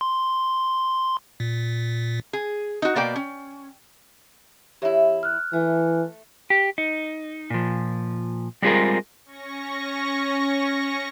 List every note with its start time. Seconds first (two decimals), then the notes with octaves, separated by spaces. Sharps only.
0.01 C6
1.40 A#2
2.33 G#4
2.82 D#4 F#4
2.96 B2 A#3 D5 G5
3.16 C#4
4.82 E2 E4 G4 C#5 E5
5.23 F6 F#6
5.53 E3 A3
6.50 G4
6.78 D#4
7.50 A#2 F3
8.62 G3 G#3 C4 F4 G#4 A#4
9.25 C#4 C#6 A#6